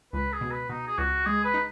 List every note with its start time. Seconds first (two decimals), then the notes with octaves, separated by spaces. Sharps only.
0.13 C#2 B4
0.33 G#4
0.41 B2
0.51 B4
0.69 B2 D#4
0.87 G#4
0.98 C#2 F#4
1.26 G#3 G#4
1.44 B4
1.54 D#4